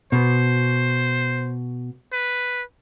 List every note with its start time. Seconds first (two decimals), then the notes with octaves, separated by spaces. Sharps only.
0.12 B2 C5
2.13 B4